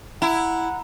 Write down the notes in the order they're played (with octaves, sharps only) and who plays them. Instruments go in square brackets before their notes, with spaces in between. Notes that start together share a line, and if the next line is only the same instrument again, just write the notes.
[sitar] E4 [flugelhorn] F#5 [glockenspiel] A#5